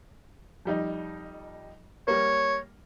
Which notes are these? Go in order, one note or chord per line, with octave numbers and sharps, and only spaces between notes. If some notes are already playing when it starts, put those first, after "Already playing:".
F2 G3 D#4
G3 A#3 C#5